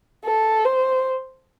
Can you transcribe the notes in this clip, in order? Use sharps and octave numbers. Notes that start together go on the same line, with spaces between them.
A4
C5